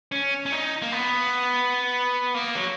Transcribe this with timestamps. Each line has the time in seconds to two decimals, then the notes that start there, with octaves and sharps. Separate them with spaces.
0.12 C#4
0.46 C#4
0.52 D#4
0.82 A#3
0.92 B3
2.35 A#3
2.56 F#3